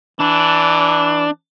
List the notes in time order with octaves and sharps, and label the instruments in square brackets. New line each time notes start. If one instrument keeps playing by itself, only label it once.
[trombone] E3 [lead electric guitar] D4